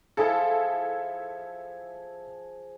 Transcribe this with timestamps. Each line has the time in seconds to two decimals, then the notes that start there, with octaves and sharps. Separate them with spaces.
0.17 F3 E4 G#4 A4